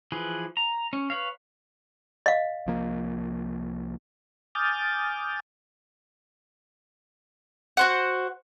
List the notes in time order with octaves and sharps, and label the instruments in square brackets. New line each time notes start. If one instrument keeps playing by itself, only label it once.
[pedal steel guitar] E3 F3 G#4 B4
A#5
C#4
B4 C#5 F5
[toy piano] D#5 F5
[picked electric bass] C2 F3 A#3
[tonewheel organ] G#5 D6 D#6 F6 G6 A6
[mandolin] F#4 C5 F#5